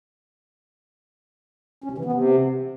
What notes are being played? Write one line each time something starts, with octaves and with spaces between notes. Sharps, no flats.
C#4
C3
E3
B3
C3